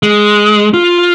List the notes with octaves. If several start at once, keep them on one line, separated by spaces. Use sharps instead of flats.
G#3
F4